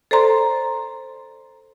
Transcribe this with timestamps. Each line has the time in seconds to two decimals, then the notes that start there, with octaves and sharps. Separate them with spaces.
0.11 A4 C5 D5 A#5 C6